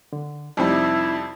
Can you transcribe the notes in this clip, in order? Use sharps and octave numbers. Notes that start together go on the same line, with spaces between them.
D3
F2 C3 G3 C4 D#4 E4